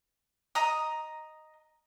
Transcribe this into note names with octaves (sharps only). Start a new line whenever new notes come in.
D#5 A#5 D#6